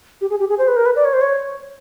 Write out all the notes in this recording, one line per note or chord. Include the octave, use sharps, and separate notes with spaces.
G4
G#4
G4
G#4
C5
B4
A#4
B4
D5
C#5
C5
C#5